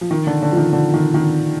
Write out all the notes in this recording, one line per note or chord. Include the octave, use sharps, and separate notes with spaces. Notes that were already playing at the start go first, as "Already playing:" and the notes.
F3
D#3
D3
D3
F3
D#3
D3
D#3
D#3